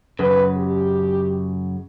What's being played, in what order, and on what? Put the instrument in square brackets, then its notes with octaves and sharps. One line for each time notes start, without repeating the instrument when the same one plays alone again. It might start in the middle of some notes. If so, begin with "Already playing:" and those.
[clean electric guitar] F#2 C#3 [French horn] B4
[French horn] G4